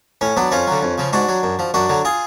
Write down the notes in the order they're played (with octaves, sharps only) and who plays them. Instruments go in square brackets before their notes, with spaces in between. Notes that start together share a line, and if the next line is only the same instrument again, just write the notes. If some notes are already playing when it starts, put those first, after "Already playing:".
[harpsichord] A2 C#4
F#3 B3 D4
F2 C#4 F4
D3 F#3
F2
C#3 F3
G#2 D4 F#4
F#3
F#2
F3
F#2 D4 F#4
D3 F#3
F4 G#4